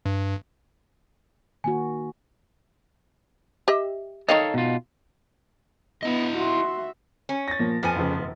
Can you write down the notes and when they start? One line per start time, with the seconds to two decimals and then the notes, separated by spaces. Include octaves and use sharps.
0.06 G2
1.64 D#3 A#3 F#4 G#5
3.68 G4 D#5 E5
4.29 D#3 D#4 A4 C#5 D#5 F5
4.54 B2 F4
6.03 B3 E4 D#5
6.37 F#4 E5 C6
7.29 C#4
7.48 A6 A#6
7.59 A#2 F3 A#3
7.83 F2 F3 B3 G#5
7.96 F1 F2 C#3
8.19 E1